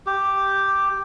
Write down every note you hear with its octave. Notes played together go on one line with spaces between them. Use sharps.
G4